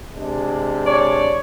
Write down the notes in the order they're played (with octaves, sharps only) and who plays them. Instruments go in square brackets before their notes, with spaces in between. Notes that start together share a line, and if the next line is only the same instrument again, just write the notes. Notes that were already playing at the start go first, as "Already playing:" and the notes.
[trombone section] C3 G#3 D4
[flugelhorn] C#5 [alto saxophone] D5